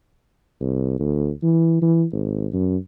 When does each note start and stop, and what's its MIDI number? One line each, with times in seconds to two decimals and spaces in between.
0.61 0.96 36
0.99 1.30 38
1.43 1.78 52
1.82 2.05 52
2.13 2.47 32
2.53 2.77 42